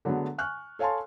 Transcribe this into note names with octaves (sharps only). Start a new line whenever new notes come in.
D3 F#3 G#3 A3 B3
G#5 C#6 F6 F#6
A4 C#5 F5 G#5 A5 C6